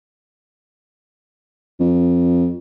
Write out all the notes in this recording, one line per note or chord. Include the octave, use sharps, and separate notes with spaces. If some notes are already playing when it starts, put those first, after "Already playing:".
F2